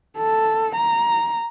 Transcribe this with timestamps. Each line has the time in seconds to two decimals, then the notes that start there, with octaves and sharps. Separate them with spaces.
0.17 A4
0.75 A#5